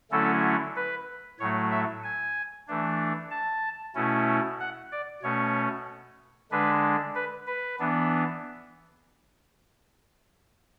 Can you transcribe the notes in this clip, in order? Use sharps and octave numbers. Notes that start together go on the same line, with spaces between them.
D3 F#3 A3 C#4 E4 A4
B4
A2 F#3 A3 C#5
E5
G#5
E3 A3 D4
A5
B2 A3 C#4 E4
F#5
D5
B2 A3 C#4 C#5
D3 G#3 D4 B4
B4
B4
E3 B3 D4